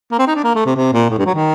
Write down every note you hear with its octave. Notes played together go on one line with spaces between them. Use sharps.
A#3
C4
D#4
D4
A#3
A3
C3
C3
A#2
A2
G2
F#3
D#3